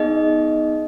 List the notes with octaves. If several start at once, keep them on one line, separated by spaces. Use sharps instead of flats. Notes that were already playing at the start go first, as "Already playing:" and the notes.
Already playing: B3 D#4 G#4 D#5